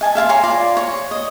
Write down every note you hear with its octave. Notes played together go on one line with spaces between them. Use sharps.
D#5 G#5 A5
E5 F5 A5 C6
C#5 G#5 A#5 C6
F4 D5 A#5 C6
C#5
D#5